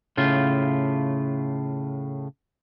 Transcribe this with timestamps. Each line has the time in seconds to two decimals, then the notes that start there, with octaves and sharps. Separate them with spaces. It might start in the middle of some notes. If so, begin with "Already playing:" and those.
0.17 A2 C#3 F4